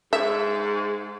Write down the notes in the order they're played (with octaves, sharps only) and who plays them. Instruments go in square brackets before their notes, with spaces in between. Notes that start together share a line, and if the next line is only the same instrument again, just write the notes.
[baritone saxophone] G#2 [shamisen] E5